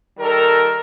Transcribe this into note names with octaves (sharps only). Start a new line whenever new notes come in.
D#3 G3 A4 A#4